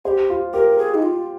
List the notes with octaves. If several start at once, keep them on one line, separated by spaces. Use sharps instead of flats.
G4 G#4 C5
F4
G4 A#4
G#4
D#4
F4